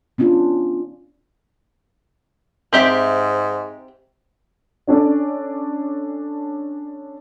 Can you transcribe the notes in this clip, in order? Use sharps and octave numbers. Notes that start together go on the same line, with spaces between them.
B3 C#4 D4 F4
G#2 C4 G4 E5
C#4 D4 A4 D5